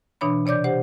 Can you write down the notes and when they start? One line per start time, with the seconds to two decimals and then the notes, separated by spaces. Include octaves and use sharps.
0.21 B2 E3 D4 C#5 B5
0.46 C3 C#5 D5 D6 G6
0.64 G4 C5 F#5